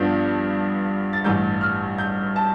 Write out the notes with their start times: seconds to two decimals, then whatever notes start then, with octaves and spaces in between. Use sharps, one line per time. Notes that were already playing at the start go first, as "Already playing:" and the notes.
Already playing: G2 F3 B3 D4 G6
1.13 A6
1.24 A1 G2 E3 G6
1.61 F6
1.98 G6
2.36 A5